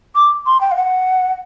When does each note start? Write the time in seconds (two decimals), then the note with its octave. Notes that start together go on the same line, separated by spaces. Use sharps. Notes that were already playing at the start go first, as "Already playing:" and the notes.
0.15 D6
0.46 C6
0.61 G5
0.71 F5
0.76 F#5